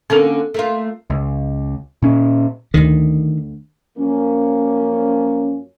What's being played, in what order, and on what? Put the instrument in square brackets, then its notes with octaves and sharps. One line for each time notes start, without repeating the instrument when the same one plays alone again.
[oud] D3 A#3 C#4 [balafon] C4 A4
[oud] A3 A#3 F4
[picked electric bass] C#2
A#2 C#4
[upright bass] D2 D3 [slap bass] D#3
[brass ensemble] F#2 F3 A#3 C#4